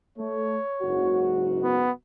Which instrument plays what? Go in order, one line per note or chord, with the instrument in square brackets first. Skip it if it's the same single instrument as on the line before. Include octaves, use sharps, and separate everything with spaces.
[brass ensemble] A3 [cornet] C#5
[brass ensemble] F#1 G#2 F#4
[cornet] B3